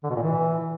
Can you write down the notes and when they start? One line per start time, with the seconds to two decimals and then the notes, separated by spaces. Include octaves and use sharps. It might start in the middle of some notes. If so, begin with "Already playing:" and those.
0.04 D3
0.10 B2
0.16 A#2
0.22 E3